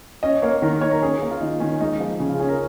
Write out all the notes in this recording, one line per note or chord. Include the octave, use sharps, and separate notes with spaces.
C#4 D#5
A#3 C#5
D#3 A#4
D#3 C#5
A#4
C#4 G#4
A#3
F4
D#3 D#4
D#3 C#4
G#3 D#4
F3 D#4
C#3 C#4
F4
C#4 G#4
A#4